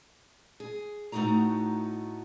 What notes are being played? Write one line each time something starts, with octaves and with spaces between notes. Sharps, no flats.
G#4
A2 A3 B3 D#4 F#4 A#5